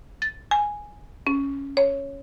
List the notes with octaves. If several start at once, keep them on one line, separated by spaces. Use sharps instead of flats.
A6
G#5
C#4
C#5